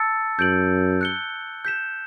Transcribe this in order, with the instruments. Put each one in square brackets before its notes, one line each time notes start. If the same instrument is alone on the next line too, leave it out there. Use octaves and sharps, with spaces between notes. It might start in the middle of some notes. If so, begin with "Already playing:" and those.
Already playing: [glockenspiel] A5 E6 A6 C#7
[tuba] F#2 [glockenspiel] G6 D7 F#7
[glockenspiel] F#6 C#7 G7
G6 B6 E7